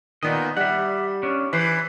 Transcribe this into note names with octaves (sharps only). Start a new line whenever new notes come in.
A#2 D#3 B3 D#5
G3 E5 F#5
C#4 D4
E3 B4 C5